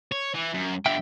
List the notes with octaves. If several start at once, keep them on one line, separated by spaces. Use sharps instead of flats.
C#5
E3
F#2
G2 D3 E5 G5